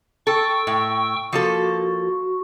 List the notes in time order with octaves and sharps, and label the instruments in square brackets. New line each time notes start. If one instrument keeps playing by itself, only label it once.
[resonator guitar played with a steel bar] A4 [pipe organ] G5 C#6 E6
[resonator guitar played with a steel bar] A2
[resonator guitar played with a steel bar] F3 A#3 A4 [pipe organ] F#4